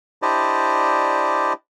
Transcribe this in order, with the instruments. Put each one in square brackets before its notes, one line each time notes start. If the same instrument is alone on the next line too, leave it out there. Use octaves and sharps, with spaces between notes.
[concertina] D4 E4 G4 C5 D5 D#5